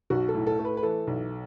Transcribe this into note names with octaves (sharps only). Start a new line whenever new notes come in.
B1 F#4
A4
A2
A4
A3
B4
B4
E3 A4
B1